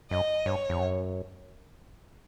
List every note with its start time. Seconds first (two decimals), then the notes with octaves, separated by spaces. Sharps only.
0.11 F#2 D#5
0.46 G2 C#5
0.69 F2
0.80 F#2